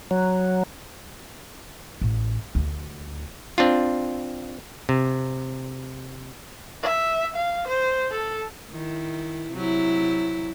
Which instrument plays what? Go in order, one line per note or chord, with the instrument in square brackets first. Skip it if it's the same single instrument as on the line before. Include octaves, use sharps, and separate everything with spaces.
[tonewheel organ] F#3
[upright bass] A1
D2
[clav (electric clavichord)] C4 D4 F4
C3
[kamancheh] E5
F5
C5
A4
[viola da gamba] D#3 E4
C3 F#3 E4